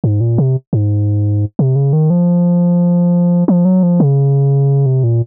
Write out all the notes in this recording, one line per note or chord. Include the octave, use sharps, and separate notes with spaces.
G#2
A#2
C3
G#2
C3
C#3
D#3
F3
F3
F#3
F3
C#3
C3
A#2